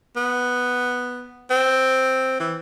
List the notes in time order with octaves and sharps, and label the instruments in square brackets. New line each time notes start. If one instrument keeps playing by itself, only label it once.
[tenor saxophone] B3
C4
E3